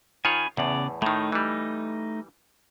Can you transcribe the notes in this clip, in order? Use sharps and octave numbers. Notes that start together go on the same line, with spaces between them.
D#3 F4 C#5 G#5 B5
E2 A2 C#3 B3 D5
A2 D#3 A3 D#4
E3 G3